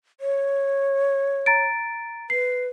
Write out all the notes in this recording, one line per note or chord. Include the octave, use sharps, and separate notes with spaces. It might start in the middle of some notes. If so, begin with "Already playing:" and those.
C#5
A#5 A6 D7
B4 C7